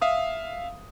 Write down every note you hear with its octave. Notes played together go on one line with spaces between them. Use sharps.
E5 F5 D#6